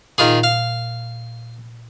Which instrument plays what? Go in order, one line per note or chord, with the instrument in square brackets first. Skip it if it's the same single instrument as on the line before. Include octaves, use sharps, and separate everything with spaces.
[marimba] A#2 [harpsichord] D#3 F4 G#4
[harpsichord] F5